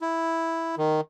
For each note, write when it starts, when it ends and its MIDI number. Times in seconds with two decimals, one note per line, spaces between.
0.01 0.75 64
0.77 1.01 51